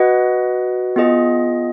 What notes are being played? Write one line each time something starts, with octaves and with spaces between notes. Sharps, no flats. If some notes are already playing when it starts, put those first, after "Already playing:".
Already playing: F#4 B4 D#5 F#5
B3 F4 G#4 D#5